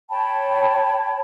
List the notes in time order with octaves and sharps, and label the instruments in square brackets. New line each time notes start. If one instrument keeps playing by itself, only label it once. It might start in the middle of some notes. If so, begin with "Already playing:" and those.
[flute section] C#5 G5 A5 B5